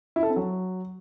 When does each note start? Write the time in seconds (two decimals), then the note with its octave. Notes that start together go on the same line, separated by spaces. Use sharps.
0.16 E4
0.23 A4
0.29 C4
0.36 F#3